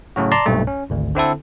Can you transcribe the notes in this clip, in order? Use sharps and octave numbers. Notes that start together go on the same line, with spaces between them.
A2 C#3 F#3 F#4
D5 A5 A#5 C6
B1 G2 A#2 A3
C#4
G#1 D2
D3 C4 E4 A4